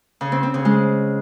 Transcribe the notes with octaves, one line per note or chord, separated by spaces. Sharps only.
C#3
C4
C4
C#3
G#3